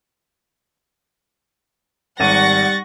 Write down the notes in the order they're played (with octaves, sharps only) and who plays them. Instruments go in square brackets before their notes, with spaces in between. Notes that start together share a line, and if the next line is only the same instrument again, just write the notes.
[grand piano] G#1 D#7 [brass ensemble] G3 [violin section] F#5 C#6 A#6 [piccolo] A6